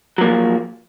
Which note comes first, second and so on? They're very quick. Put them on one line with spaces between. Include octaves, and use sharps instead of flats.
F#3 A#3 F3